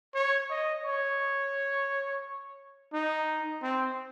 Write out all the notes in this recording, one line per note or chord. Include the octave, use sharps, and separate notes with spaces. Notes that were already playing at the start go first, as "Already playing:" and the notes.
C#5
D#5
C#5
D#4
C4